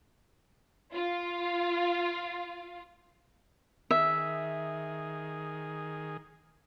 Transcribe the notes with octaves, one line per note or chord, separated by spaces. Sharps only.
F4 F5
D#3 G#4 E5